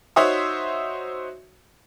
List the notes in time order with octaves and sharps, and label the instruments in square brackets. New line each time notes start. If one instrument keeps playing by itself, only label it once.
[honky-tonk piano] D#4 F#4 C5 C#5 E5 D#6